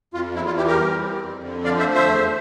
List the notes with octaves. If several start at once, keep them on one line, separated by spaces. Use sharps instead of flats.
F2 F4
E2 E4
F4
E3 E4 G4
G4 A#4
G3
C4
F2
D3
F3 D5 F5
C5 E5
A3
C5 E5
E2